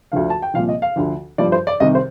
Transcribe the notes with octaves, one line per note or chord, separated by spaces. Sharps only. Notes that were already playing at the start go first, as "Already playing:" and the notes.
D2 D3 F3 F5
A5
G5
C2 A#2 F3 F5
D#5
F5
D2 D3 F3
G2 F3 D5
C5
D5
C2 C3 D#3 D#5
C5